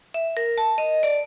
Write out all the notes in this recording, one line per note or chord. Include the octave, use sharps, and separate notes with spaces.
E5
A#4
A5
D#5
D5